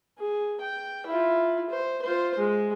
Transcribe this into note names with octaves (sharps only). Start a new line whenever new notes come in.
G#4
G5
E4 F4
C5
F4 C5
G#3